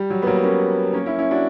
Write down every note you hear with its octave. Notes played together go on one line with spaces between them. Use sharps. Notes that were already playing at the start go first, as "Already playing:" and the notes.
Already playing: G3
F#3
B3
F#3 A#3
B3
A#3 C#4
A#3 C#4
C#4 E4
C#4 E4
D4 F#4